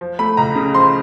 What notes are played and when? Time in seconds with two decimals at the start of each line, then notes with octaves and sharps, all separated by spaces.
0.01 F3
0.19 A3 B5
0.37 C#2 A#5
0.55 C#3
0.74 F3 C6